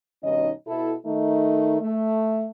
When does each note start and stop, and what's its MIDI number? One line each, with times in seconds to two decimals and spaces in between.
0.23 0.51 43
0.23 0.51 47
0.23 0.51 51
0.23 0.51 61
0.23 0.51 63
0.23 0.51 75
0.67 0.95 47
0.67 0.95 64
0.67 0.95 69
1.06 1.81 51
1.06 1.81 57
1.06 1.81 63
1.81 2.49 57